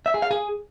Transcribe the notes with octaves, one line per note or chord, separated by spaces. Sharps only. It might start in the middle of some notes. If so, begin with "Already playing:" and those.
E5
G#4
F5
G#4